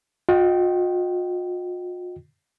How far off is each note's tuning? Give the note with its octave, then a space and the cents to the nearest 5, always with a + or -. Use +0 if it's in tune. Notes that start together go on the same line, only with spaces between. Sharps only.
F4 +45 D#5 +0 G5 -15